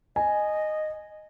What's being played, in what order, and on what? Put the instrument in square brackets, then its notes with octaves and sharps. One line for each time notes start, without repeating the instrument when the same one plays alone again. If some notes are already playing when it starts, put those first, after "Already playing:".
[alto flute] D#5 [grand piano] G#5